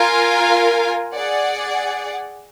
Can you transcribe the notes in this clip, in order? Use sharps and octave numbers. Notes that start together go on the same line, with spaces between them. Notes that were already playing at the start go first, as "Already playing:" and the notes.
Already playing: F4 A#4 F5 G#5
G#4 D5 F#5